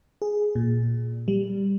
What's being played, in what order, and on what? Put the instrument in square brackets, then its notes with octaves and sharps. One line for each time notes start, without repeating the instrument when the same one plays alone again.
[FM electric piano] G#4
A#2
G3